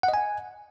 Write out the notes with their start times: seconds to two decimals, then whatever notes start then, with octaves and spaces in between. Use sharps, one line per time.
0.03 F#5
0.08 D#5
0.14 G#5